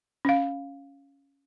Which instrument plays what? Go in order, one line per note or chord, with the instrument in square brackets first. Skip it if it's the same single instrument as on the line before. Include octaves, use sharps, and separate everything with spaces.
[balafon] C#4 F5